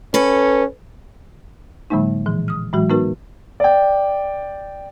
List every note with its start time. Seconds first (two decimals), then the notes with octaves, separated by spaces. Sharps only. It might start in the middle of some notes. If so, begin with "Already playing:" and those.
0.14 C#4 A4 B4
1.90 A2 D3 F#3 G#3 A#3 D#4
2.26 A#2 E3 F3
2.48 D#6 F6
2.73 A2 E3 F#3 G#3 F#4
2.90 B3 D#4 F#4 A#4 B4
3.60 D5 G5